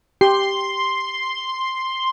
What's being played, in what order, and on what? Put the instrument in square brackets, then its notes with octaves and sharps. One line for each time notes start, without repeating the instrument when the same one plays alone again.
[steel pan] G4 [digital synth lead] C6